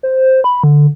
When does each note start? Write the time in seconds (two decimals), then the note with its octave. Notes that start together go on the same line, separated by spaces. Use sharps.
0.03 C5
0.44 B5
0.64 D3